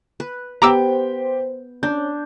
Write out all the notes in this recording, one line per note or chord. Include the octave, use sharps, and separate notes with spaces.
B4
B3 G4 C5 G5 A#5 D6 E6
C#4 D4 G6